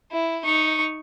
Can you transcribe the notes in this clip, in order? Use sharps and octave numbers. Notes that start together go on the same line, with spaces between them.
E4
D#4 C#6